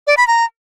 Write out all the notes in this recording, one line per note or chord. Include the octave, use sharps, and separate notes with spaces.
D5
B5
A#5